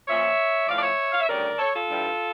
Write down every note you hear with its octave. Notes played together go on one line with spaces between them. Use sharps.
A#2 F3 C#4 C#5 E5
A2 F3 C#4 D5 F5
D5
C#5 E5
F5
E5
D2 C#3 G3 C#4 A#4 D5
A4 C#5
F4 A4
G2 E3 G3